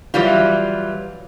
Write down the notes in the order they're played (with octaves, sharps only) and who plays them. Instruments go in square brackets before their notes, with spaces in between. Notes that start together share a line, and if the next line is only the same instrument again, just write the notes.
[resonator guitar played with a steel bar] E3 F#3 G3 F4